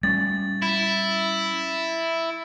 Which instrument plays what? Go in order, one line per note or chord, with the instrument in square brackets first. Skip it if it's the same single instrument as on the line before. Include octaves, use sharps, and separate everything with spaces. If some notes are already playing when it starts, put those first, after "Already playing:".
[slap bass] G3 B3 C#4 [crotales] A6
[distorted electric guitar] E4